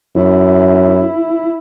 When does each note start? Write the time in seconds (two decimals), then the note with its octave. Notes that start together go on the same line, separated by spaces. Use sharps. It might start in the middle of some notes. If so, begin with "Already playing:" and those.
0.15 F#2 E4